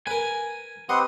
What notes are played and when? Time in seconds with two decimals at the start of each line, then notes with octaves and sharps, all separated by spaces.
0.07 A#4 B4 G#5
0.89 C4 G4 B4 D#5 F#5 C6